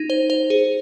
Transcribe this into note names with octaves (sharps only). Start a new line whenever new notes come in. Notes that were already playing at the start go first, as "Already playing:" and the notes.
Already playing: D#4
C5
C5
G#4